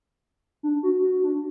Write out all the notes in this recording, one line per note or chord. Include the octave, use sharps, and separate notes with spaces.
D4
F#4
F#4
D4